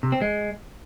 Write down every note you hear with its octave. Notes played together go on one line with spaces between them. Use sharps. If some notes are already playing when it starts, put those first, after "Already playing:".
C3
C4
G#3